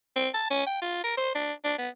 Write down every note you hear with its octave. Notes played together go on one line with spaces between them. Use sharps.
C4
A5
C#4
G5
F4
A#4
C5
D4
D4
B3